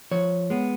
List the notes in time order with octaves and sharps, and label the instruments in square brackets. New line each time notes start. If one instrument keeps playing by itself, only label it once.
[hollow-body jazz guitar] F3 C#5
G#3 B3